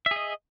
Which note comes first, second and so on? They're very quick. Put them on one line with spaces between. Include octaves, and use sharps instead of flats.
E5 G#4 D#5